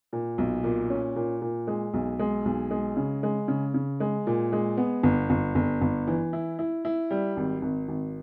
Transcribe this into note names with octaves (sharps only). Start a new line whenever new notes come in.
A#2
B1
A#2
C#4
A#2
A#2
G#3
B1
G#3
B1
G#3
C#3
G#3
C#3
C#3
G#3
A#2
G#3
B3
G1
G1
G1
G1
E3
E4
E4
E4
G3
G#1
G#1
G#1